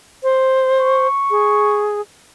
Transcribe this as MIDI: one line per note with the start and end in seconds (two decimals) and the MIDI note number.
0.23 1.07 72
0.79 1.86 85
1.31 2.01 68